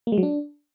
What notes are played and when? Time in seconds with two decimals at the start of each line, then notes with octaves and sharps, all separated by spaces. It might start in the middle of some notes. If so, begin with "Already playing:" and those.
0.07 A#3
0.12 G#3
0.18 F#3
0.23 D4